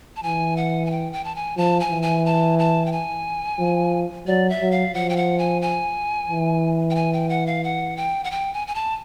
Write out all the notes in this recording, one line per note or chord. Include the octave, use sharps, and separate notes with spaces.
A5
E3 G#5
F#5
G#5
G5
G5
A5
G#5
F3 A5
G#5
E3
G#5
A5
A5
G5
G#5
F3
F#3 D5
E5
F#3
F5
F3 F#5
G5
F#5
G#5
G#5
E3
G5
G#5
G5
F#5
F5
F#5
G5
F#5
G5
G#5
G#5
A5